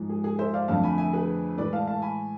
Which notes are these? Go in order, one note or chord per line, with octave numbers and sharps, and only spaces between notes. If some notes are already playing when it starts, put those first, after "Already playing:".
Already playing: G#2 F3 G#3
G#4
G#4
C5 E5
D5 F5
F2 D3 A3 F5 A5
G#5 B5
E5 G#5
G#4 B4
A2 E3 G#3 B4 D5
F5 A5
F5 A5
G#5 B5